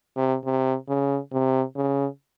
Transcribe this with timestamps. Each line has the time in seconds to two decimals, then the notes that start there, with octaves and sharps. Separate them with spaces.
0.16 C3
0.45 C3
0.88 C#3
1.32 C3
1.76 C#3